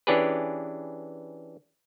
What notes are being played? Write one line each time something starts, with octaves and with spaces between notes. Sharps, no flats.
E3 C#4 D4 G4 G#4 B4